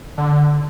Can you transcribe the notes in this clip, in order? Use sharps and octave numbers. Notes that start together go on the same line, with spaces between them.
D3